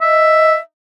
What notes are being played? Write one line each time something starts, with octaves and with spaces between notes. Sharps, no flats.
D#5 E5